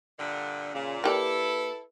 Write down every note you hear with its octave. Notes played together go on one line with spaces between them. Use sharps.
G2 A#2 D3
A#2 C#3
A#3 E4 G4 A4 B4 D5